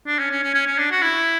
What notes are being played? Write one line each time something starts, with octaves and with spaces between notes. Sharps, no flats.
D4
C#4
C#4
C#4
C#4
C#4
D4
F#4
E4